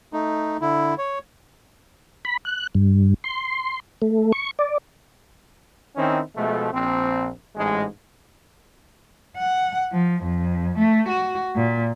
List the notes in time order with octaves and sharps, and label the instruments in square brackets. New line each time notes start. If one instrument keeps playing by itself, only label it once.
[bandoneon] A3 D#4
D3 E4
C#5
[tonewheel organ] B5
F#6
G2
C6
A3
C#6
D5
[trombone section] D#3 C4 C#4 D#4 E4
B2 F3 G#3 A3
A#1 C4
A1 G#2 G#3
[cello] F#5
F3
F2
A3
F#4
A#2